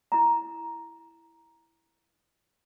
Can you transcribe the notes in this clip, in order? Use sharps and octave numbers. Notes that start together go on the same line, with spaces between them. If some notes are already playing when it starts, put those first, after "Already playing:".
E4 A#5